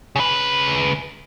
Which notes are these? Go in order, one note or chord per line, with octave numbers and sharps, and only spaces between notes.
C#3 B4